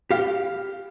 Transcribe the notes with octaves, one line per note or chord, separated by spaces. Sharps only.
G4 F5